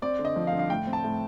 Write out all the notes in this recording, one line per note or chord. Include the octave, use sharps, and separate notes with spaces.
C4 D5
D3
D#5
F3
F5
D3
F5
A2 G5
C4
A5
A2